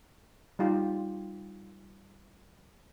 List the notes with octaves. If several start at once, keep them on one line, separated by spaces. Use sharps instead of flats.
G3 D#4 F4 G4